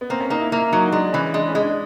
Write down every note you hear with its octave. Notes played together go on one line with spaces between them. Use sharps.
B3
A#3 C4
C#4
A#3 D#4
E4
A#3 E4
F#3 D#4
G#3 D4
E3 C#4
G#3 D4
C#4
G#3
D4